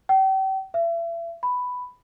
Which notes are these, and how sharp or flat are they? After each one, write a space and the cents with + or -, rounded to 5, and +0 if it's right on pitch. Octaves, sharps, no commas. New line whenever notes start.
G5 -40
E5 +35
B5 +5